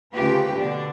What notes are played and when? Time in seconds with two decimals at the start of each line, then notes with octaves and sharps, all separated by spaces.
0.12 D2 C#3 A#3 F4 G4 B4
0.56 B2 D3 D4